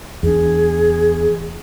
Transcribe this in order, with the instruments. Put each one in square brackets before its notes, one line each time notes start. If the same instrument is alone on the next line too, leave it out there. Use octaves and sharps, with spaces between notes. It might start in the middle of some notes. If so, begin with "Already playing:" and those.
[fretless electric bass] E2 D4 [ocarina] G#4